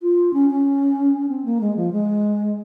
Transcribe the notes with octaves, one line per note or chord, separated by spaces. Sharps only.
F4
C#4
C#4
C4
A#3
G#3
F3
G#3